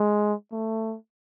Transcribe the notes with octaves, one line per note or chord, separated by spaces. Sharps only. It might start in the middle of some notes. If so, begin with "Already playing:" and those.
Already playing: G#3
A3